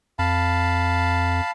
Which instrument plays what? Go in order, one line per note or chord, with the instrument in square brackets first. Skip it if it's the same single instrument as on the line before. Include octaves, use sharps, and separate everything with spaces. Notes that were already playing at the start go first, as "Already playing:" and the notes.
[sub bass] F2 [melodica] F5 A5 B5